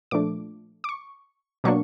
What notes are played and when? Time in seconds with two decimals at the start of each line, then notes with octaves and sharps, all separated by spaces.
0.11 A#2 F3 A3 D4 D6
0.84 D6
0.89 C#6
1.64 B2 F#3 A#3 D4 C#6